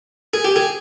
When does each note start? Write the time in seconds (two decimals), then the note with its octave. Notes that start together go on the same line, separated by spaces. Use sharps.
0.34 G#4
0.44 G4
0.56 G#4